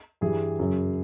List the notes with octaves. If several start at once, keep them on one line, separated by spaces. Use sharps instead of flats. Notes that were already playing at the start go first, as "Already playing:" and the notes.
G2 E3 G3 G#4
F#2 C#3 F#3